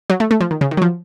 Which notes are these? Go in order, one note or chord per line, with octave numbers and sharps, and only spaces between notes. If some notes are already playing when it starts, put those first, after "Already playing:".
F#3
A3
A3
F3
D#3
C#3
D#3
F#3
F3